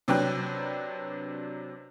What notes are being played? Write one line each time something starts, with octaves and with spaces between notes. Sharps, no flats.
C3 F#3 D4 B4 G5 F#6